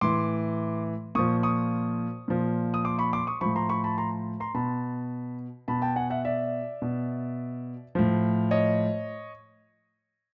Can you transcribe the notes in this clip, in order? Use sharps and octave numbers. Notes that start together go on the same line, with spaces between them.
A2 E3 C6 D6
A#2 F3 C#6 D#6
C#6 D#6
A#2 F3
D#6
C6 D6
B5 C#6
C6 D6
C#6 D#6
A2 F3 B5 C#6
A#5 C6
B5 C#6
A5 B5
A#5 C6
A#5 C6
B2 A5 B5
B2 A5 B5
G5 A5
F#5 G#5
E5 F#5
D5 E5
B2
A2 F3
C#5 D#5